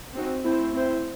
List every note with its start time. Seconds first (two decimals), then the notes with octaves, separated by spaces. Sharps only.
0.15 C4 D#4 F#4
0.44 A3 C4 E4 C5
0.74 C4 E4 C5